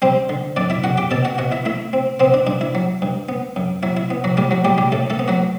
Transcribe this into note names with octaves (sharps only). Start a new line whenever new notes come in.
G3 C4 C5
D3
F#2 D4 D5
E4 E5
F#2 F#4 F#5
G4 G5
B2 A4 A5
F#4 F#5
B2 F#4 F#5
E4 E5
A3 E4 E5
C4
B3 C4 C5
D4
G2 D4
E4
F#3
G2
B3
F#2
F#3 E4
E4
B3
F#3 F#4
A2 G3 G4
F#3 F#4
A2 G3 G4
G3 G4
A2 A3 A4
A3 A4
B3
F#3 F#4